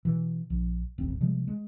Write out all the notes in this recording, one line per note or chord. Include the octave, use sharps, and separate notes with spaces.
B2 E3
A#1
D#1 A1 C4
C3 F3 G3 G#3
G#3